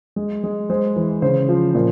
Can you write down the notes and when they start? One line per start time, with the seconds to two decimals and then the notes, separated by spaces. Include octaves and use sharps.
0.16 G#3
0.44 G#3
0.70 G#3 C5
0.96 E3
1.22 C#3 C5
1.49 F3
1.75 A#2